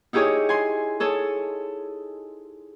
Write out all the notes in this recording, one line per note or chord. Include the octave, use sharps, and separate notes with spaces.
D#4 E4 G4 G#4 C#5
G#5 C6
G#4 A4 C#5